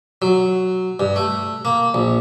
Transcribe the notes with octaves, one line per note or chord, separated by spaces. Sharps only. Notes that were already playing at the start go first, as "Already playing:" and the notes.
F#3
G2
A3
A#3
A#1